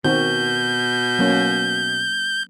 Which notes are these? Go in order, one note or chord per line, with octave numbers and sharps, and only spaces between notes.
B2 D#3 C4 F#4 G6
F#3 A#3 C#4